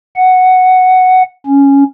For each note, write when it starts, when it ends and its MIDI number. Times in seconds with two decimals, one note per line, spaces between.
0.16 1.22 78
1.46 1.83 61